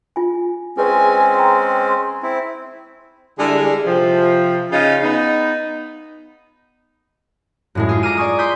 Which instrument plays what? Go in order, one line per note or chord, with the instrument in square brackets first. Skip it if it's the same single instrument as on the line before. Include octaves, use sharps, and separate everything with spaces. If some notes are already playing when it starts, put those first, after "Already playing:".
[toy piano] F4 G#5
[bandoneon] G#3 C4 C#4 [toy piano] G#4 B4 D5 [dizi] G#5
[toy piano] G5 A#5 [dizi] C6
[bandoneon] C4 E4
[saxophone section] D3 G3 G#3 E4 G#4
C3 F3
C#3 D#4 F4
B3 D#4
[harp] F#2 A2 G#3
F4 G#4
A#5 D6 F6 D#7
D5 G#5 C#6 D#6
C6 D#6 G6 B6